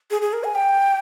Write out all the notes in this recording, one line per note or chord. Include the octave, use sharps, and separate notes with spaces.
G#4
G#4
A#4
G#5
G5